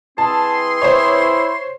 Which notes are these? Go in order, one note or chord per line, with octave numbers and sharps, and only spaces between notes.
E3 C4 G#4 A5 C6
E4 C5 C#5